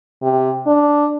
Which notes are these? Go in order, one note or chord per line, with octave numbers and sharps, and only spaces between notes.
C3
D4